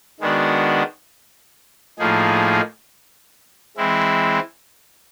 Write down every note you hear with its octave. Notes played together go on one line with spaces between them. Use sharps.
D#3 G#3 B3 D4 F#4
A2 F3 A#3 D#4 G#4
E3 G#3 C4 E4